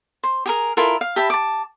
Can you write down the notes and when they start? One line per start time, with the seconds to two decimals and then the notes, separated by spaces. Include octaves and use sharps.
0.24 C5
0.46 G4 G#4 A#4
0.77 E4 F4 A4 A#4
1.01 F5
1.16 G4 E5 A5 B5
1.30 A5 D6